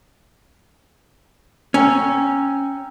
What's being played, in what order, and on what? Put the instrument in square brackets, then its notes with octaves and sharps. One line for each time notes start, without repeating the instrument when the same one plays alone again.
[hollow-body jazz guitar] C#4 [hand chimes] G5 A#5 E6